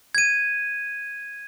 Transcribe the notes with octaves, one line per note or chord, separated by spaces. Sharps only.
G#6 D#7